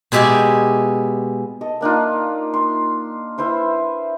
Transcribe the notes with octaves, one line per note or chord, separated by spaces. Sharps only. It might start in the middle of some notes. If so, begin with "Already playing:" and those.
B2 G#3 E4 G4 D5 G#5
A4 D#5
A#3 D4 D#4 F4
C6
E4 B4 C5 E5